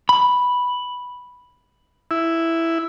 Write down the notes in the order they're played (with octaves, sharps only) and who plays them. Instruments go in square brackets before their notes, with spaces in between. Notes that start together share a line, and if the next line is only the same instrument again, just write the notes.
[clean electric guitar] B5
[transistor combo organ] E4